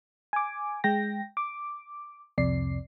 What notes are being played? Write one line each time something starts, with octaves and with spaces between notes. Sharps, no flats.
G#5 D6
G#3 G5 A#6
D6
C2 F2 C3 D5 C7